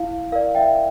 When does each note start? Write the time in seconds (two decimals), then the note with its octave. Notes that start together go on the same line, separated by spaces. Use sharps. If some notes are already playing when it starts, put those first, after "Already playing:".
Already playing: E4 F5
0.32 A#4 D5 F5
0.55 E5 G5